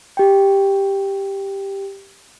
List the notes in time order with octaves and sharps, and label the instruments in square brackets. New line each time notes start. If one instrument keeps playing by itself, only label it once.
[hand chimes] G4 G5